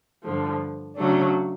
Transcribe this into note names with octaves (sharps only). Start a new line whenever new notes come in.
G2 D3 F3
C#3 F#3 A3 D4